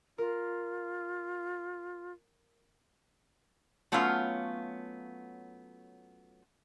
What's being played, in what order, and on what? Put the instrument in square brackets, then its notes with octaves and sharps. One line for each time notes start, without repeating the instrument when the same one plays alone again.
[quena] F4 [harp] A#4
[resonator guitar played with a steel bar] F#3 A3 B3 C#4 F4 F5